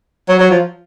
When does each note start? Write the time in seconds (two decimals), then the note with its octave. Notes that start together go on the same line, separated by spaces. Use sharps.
0.28 F#3
0.39 F#3
0.50 F3